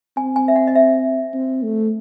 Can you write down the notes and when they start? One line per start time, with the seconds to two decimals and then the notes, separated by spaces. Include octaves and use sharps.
0.17 C4 G#5
0.36 G#5
0.48 E5
0.56 F#5
0.67 D#5
0.75 E5
1.33 C4
1.63 A3